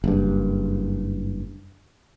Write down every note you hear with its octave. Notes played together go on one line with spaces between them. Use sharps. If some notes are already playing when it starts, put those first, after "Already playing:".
F#1 G2